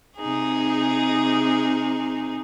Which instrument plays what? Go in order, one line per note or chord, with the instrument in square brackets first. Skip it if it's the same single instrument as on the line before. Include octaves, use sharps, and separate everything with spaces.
[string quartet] C3 D#4 G#4